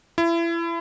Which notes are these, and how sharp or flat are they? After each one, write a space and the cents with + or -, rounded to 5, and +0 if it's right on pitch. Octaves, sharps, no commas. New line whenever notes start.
E4 +30